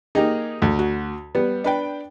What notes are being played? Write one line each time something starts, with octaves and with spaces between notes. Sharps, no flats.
A#3 D#4 G4 G#4
D2
F#4
G3 B3
D4 B4 G5